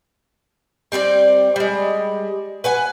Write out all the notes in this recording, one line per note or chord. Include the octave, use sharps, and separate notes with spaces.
G3 C4 D#4 D5
G3 G#3
B4 F#5 G#5